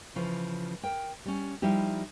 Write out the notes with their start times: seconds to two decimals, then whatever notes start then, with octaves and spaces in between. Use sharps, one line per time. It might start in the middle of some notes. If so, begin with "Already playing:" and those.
0.16 C#3 E3 F3
0.83 A#4 G5
1.26 G3 C#4
1.62 F3 G3 D#4 E4 G4